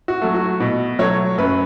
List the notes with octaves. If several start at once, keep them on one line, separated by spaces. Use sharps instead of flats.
F#4
F#3 A3
F#4
B2
F#3 A3 C#5
F#2 B4